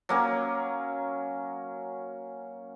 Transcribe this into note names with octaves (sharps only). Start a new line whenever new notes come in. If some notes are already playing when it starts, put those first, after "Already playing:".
F#3 A#3 C#4